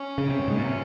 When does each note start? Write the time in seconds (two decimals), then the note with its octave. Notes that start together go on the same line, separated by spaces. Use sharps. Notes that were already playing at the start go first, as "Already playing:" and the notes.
Already playing: C#4
0.18 C#3
0.29 C3
0.39 G2
0.48 G#2
0.56 A#2
0.64 C3